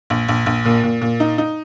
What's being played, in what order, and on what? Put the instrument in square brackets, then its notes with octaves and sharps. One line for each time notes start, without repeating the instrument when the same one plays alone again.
[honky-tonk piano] A#1
A#1
A#1
A#2
A#2
A#2
D#4
D#4